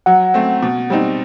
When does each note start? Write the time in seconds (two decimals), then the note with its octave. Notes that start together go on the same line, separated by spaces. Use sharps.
0.06 F#3 F#5
0.34 A3 C4
0.63 B2
0.90 G3 C4 D#4